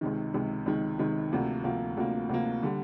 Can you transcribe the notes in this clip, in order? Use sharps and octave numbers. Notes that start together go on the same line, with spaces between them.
C#2 C3 D#3
C#2 C3 D#3
C#2 C3 D#3
C#2 C3 D#3
D2 C3 F3 A#3
D2 C3 F3 A#3
D2 C3 F3 A#3
D2 C3 F3 A#3
D3 G3